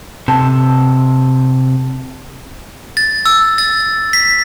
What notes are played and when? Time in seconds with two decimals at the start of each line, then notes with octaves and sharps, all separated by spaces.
0.28 C3 A4
2.97 A6
3.26 E6
3.58 A6
4.13 B6